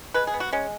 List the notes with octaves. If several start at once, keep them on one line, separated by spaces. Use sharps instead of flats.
G#3 B4
G#4
B3
F#4
G#3 C#4